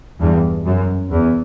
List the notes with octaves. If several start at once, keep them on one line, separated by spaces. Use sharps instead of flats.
E2 G2
F#2
E2